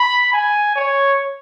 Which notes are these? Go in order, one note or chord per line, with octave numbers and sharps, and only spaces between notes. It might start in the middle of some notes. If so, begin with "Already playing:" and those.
Already playing: B5
G#5
C#5